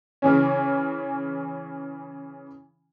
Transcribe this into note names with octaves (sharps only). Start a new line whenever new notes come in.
C#3 E3 C#4